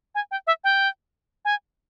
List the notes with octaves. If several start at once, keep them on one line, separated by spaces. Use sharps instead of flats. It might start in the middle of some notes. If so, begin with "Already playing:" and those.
G#5
G5
E5
G5
G#5